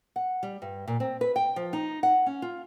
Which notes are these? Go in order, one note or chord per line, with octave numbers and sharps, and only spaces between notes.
F#5
G3
G2
A#2
C4
B4
G5
F3
D#4
F#5
C#4
F4